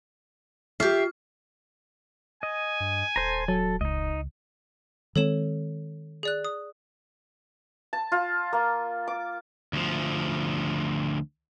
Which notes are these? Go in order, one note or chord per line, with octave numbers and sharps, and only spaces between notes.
F4 G4 E5 F6 C7
D#5 G#5
G2
D#1 A4 C5 A#5
F#3 A4
C#2 D#4 D#5
D#3 G#3 C4 A4 C#5 E7
G#4 D5 F#6
D#6
A5
F4
A#3
D6
D2 F3